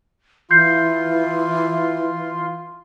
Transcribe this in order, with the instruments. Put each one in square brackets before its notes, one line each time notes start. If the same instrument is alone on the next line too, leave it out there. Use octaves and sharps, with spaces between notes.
[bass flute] E3 [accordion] F4 C6 [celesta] G6 C7